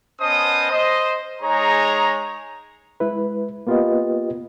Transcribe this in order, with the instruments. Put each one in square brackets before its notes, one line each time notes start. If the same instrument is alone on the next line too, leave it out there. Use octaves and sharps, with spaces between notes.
[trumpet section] B3 C#4 C5 D#5 A5 D#6
C5 D#5
G#3 D#4 G#4 C#5 A#5
[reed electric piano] G#3 E4 B4
A#3 B3 F4 G4 B4 D#5